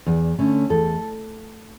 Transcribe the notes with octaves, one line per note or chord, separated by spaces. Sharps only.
E2
D3 A3 C#4
E2 A4